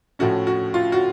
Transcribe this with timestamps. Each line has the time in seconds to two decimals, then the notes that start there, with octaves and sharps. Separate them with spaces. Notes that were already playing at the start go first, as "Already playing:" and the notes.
0.19 A2 F3 A3 C#4 F#4
0.47 F#4
0.74 F4
0.92 F#4